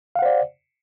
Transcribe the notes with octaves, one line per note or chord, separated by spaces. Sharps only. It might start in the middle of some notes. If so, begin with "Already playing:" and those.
C5 D5 F5 F#5